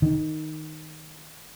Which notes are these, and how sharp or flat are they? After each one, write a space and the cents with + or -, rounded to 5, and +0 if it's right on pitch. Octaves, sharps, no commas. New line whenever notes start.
D#3 +0